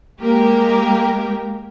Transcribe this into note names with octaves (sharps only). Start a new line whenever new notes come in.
G#3 A#3 G4 A#4